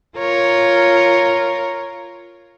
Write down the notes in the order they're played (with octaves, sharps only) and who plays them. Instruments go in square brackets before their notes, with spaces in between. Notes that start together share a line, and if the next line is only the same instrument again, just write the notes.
[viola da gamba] F4 A#4 C#5